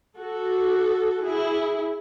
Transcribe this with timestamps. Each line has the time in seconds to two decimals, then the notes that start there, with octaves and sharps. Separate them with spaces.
0.17 F#4 A4
1.24 E4 G#4